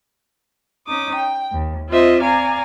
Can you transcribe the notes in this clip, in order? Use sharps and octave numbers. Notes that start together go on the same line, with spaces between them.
C#4 D#4 D6 D#6
G5
D#2
C4 F4 C5 D#5 E5
D5 F5 G#5 A#5